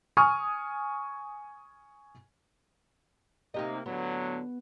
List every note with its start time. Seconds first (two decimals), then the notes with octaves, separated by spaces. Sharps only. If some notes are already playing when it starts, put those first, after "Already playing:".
0.17 G#5 C#6 D#6 F6
3.54 C3 A#3 D#4 G4 D#5
3.86 A2 D3 F#3 B3